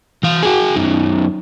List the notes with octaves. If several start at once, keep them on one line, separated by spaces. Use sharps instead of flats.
E3 F5
F#4 G#4
F#2 D#3